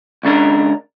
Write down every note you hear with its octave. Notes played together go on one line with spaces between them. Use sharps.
C#2 C#3 D4 A#4